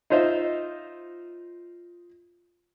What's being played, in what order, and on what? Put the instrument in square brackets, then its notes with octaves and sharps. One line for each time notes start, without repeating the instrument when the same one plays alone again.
[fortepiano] D#4 F4 C5 D#5 E5